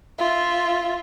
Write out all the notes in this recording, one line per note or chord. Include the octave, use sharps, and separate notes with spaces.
F4 E5